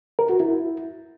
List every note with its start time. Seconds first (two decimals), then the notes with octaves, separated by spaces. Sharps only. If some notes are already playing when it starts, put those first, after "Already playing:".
0.19 A#4
0.29 F#4
0.40 E4